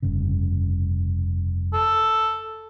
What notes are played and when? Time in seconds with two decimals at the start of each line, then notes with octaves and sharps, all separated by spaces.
0.02 F1 G2 C#3
1.74 A4